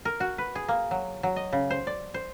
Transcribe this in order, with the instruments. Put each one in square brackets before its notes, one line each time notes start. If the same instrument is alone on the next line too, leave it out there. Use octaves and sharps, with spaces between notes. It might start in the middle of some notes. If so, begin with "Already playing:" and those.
[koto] A#4
F#4
B4
G#4
A#3
F#3
F#3
D#5
C#3
C5
D5
C5